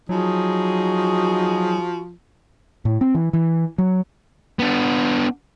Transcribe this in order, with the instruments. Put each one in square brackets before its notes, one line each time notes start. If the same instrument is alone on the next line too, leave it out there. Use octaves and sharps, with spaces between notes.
[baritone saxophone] F3 [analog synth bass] F#3 [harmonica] D#4 G#4 [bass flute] F#4
[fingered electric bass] A2
C4
E3
E3
F#3
[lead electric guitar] B3 D4